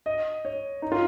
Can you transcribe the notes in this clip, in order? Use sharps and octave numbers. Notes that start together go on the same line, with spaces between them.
D#5
C#5
D#4
F4